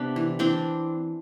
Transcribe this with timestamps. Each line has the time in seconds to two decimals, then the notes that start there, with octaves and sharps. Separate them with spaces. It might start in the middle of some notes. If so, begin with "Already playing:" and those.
Already playing: C3 B3 D4
0.16 E3
0.39 E3 C4 D4